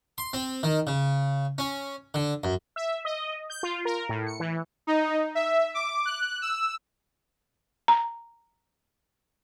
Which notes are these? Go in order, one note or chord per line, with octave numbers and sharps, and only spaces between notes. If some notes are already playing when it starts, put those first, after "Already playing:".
C6
C4
D#3
C#3
C#4
D3
F#2
E5
D#5
G6
F4
A#4
A2
C#7
E3
D#4
E5
D6
F#6
E6
A#5